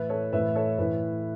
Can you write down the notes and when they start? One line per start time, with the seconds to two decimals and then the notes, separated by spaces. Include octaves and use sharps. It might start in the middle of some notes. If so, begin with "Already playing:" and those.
Already playing: A2 E3 B4 E5
0.09 A4 C#5
0.32 A2 E3 B4 E5
0.55 A4 C#5
0.78 A2 E3 B4